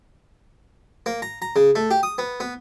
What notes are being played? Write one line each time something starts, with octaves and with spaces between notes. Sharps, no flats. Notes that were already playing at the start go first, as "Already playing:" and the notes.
A#3
A#5
A#5
C#3
A3
G4
D#6
B3
B3